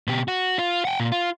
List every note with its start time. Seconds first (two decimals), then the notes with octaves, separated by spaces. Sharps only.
0.08 B2 G4
0.28 F#4
0.59 F4
0.85 F#5 G5
1.00 A#2
1.12 F4